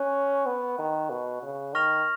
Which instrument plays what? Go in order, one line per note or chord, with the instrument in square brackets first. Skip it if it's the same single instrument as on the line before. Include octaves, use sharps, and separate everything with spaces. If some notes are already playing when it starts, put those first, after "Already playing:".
Already playing: [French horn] C#4 [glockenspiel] C#6 F#6
[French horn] B3
D#3
B2
C#3
[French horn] D#3 [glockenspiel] C#6 F6 A#6 F7